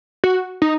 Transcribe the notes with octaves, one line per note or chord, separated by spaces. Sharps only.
F#4
D#4